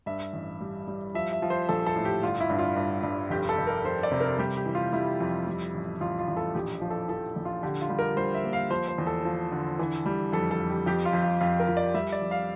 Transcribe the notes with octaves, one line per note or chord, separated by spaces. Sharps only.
G2 E5
A1
G3
G3
F3 E5
E5
F3
C5
A#1 A4
A4
A2
G4
G1 F4
E4
G2
F4
G2
G2
F1 G4
A4
F1
A#4
F1 C5
D5
C3
A#4
G3 G4
G4
E3
F4
G3 E4
F2
G3
A1
A1 F4
F4
A1
A4
A#1 G4
F3
A4
F3 A4
A#1
F4
D3 G4
F4
G3
A#4
G3 C5
E5
A#3
F5
F3 C5
C5
E2
A4
F3
D3
E3
G3
F2 A4
A4
F2
G4
F2 G4
F4
F2
F4
F2 F4
A#4
F2
D5
G3 E5
D5
F2
F5